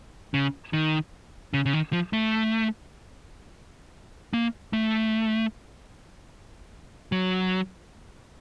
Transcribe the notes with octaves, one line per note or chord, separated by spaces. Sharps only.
C#3
D#3
C#3
C#3
D#3
F3
A3
A#3
A3
F#3